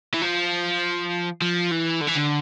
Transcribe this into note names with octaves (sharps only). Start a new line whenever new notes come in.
E3
F3
F3
E3
D3
E3
D3